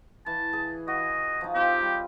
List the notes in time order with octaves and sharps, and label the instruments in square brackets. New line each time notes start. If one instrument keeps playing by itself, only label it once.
[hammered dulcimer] E3 [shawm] A5
[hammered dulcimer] G#4
[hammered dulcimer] F#4 [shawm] D#5
[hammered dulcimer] F3 D#4
[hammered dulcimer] C4 D#4 F4 [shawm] G4
[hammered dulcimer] G3